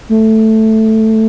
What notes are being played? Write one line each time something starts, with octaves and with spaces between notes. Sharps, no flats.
A3